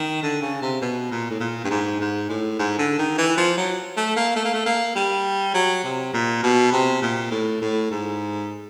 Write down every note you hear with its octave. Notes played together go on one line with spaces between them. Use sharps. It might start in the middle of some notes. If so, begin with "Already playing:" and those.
Already playing: D#3
D3
C#3
C3
B2
A#2
A2
A#2
G2
G#2
G#2
A2
G#2
D3
D#3
E3
F3
F#3
A3
A#3
A3
A#3
A3
A#3
G3
F#3
C3
A#2
B2
C3
A#2
A2
A2
G#2